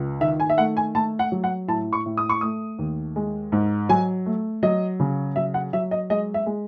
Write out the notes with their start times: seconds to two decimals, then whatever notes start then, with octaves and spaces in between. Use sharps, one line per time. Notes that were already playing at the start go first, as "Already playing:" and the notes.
Already playing: C#2
0.21 D#3 E5
0.40 G#5
0.49 E5
0.58 A3 F#5
0.77 G#5
0.95 A3 A5
1.19 F#5
1.32 F#3
1.44 F#5
1.68 A2 A5
1.93 C#6
2.06 A2
2.17 D#6
2.29 C#6
2.41 A3 D#6
2.79 D#2
3.16 G#3
3.52 G#2
3.89 F#3 G#5
4.26 A3
4.63 F#3 D#5
5.00 C#3
5.36 F#3 E5
5.54 F#5
5.73 F#3 E5
5.91 D#5
6.10 G#3 D#5
6.34 E5
6.46 G#3